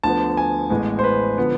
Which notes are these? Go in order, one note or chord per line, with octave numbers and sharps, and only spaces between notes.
D2 D3 F3 B3 A5
G#5
A1 A2 G#3 B3
C5
B4
D3 F3 B3